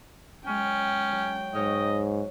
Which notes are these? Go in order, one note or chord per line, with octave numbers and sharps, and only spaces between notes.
F#3 G#3 C#4 G5
F#3
G#2 F#3 C#5 D#5 F6